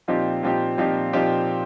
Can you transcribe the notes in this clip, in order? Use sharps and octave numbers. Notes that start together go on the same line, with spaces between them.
A#2 F3 C4 D#4 G4
A#2 F3 C4 D#4 G4
A#2 F3 C4 D#4 G4
A#2 F3 C4 D#4 G4